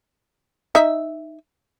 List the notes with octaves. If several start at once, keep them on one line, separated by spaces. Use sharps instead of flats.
D#4 E5